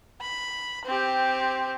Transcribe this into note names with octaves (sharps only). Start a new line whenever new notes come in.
B5
C4 G4